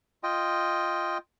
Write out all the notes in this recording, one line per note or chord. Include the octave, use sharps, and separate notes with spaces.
F4 D#5 G5